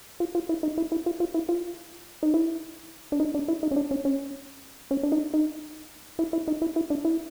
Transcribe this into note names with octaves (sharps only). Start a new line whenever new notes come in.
F4
F4
E4
D#4
E4
E4
F4
F4
E4
F4
D#4
E4
D4
D#4
D4
E4
D#4
C#4
D4
C#4
C#4
C#4
D4
D#4
D#4
E4
E4
D#4
E4
E4
D4
E4